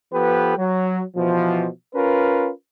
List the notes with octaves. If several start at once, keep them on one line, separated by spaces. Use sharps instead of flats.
F3 B3 G4 A4 B4
F#3
B2 E3 F3
C#4 F4 A#4 B4